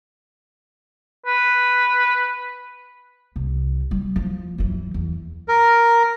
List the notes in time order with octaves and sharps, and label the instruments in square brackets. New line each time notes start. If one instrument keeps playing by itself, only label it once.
[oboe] B4
[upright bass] C2
G3
F3
F#2 E3
E2
[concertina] A#4